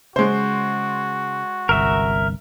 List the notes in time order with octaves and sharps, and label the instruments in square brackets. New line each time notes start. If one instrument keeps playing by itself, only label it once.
[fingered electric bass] C#3 [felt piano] G#3 C5 [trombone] F#4
[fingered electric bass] G1 C2 [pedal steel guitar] A#4 E5